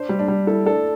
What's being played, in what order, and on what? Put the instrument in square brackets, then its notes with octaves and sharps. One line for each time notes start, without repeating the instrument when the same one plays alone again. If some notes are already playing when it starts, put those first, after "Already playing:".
Already playing: [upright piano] D4 [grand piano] C5
[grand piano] G3
[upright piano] D4
[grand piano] G3
[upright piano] E4 [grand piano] A4
[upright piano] D4 [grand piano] A4